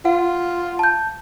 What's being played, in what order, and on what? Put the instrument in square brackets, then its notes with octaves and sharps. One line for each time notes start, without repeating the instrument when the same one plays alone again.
[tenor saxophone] F4 [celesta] F#5
[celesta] A5 G6